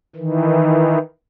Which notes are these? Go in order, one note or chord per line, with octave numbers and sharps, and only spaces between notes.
D#3 E3